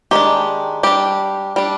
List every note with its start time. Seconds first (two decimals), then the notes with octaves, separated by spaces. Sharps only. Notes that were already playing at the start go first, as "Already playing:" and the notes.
0.11 D#3 G#3 D4 G4
0.83 G3 D4 G4
1.56 G3 D4